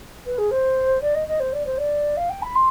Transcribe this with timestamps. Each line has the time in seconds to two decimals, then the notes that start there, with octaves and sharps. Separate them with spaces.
0.26 B4
0.37 G#4
0.51 C5
1.01 D5
1.14 D#5
1.27 D#5
1.39 C5
1.52 D5
1.66 C5
1.77 D5
2.16 F5
2.29 G5
2.42 B5
2.55 C6